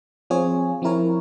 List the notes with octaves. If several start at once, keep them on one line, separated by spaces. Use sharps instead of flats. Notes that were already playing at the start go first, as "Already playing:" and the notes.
F3 C4 F4 G#4 C#5
F3 C4 E4 A#4 C#5